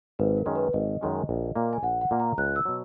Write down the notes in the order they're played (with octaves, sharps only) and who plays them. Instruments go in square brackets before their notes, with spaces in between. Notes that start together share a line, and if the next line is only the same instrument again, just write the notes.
[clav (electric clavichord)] G#1 [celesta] B4
[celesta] A#4
[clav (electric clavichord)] F#2 D#3 G#3 C#4
[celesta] B4
[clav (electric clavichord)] G#1 [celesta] D#5
[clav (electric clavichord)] F#2 D#3 G#3 C#4
A#1
A#2 A#3
[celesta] G#5
[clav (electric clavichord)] A#1 [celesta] F#5
[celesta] F#5
[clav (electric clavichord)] A#2 A#3
[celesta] A#5
[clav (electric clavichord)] C#2 [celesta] F#6
[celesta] E6
[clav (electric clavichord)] B2 F#3